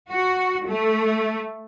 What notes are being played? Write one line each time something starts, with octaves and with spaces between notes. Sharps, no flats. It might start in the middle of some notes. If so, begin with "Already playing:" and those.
F#4
A3